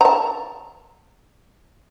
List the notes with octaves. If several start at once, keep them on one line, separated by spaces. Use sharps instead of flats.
A5 A#5